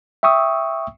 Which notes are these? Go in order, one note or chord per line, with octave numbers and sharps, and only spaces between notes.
E5 G5 C#6 D#6 E6